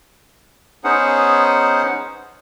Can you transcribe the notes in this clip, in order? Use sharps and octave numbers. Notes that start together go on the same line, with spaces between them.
B3 C#4 D#4 G#4 C5 F#5